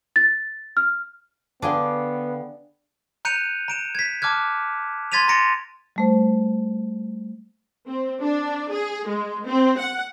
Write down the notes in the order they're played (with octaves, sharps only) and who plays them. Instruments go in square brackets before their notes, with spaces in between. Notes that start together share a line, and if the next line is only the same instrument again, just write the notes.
[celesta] A6
F6
[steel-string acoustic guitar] D3 F5 G5 [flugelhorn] B3 [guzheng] D4 G#4 C6
[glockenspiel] A#5 F#6 G6 C#7 D#7 F7
A#5 D7 E7
G#6 B6
A5 D6 F6 F#6 G#6
C6 G#6 A6 B6 D#7 F7
A#5 C6 A6 A#6 C#7 D7
[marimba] G3 A3 C5
[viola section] C4
D4
G#4
G#3
C4
F#5